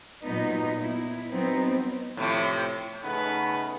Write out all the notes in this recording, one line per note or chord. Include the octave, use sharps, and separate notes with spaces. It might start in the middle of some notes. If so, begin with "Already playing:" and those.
A#2 F#3 B3 D#4
E4
F#3 B3 C4 D#4
A2 C3 F3
C#3 A3 B3 D#4 B4